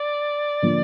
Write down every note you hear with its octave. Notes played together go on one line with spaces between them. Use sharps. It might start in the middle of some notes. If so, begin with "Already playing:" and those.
Already playing: D5
D3 F3 A#3